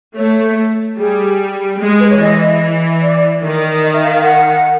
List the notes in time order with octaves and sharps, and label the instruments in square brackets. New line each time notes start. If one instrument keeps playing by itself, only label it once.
[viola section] A3 [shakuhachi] C#5
[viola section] G3 [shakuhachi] G#4
[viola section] G#3
[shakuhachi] B4
C#5
[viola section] E3 [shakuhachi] D#5
[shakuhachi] D5
[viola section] D#3
[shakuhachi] D#5
E5
F5
F5
F#5